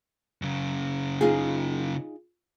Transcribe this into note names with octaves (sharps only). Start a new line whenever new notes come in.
F#2 C#3
D#4 F4 G#4